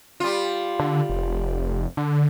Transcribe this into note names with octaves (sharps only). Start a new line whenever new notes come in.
G3 F4
D3
F1
D3